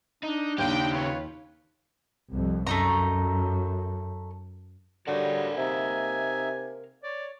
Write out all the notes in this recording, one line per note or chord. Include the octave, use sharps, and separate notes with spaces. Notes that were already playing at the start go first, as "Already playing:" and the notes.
D4 D#4
D#2 C#3 G4 F5 G5
F4 B4 C#5
C2 F2
F#2 A3 D#4 A#5
D3 G3 D#4 F#4 A#4 C#5 F5 F#5
C3 D#4 E5 G#5
C#5 D5